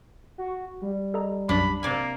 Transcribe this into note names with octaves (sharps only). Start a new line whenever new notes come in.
F#4
G3
A4 D#5 A#5
B1 F#2 F#3 D4 B5
C3 A#3 D5 G#5